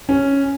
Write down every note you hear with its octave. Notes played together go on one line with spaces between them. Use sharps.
C#4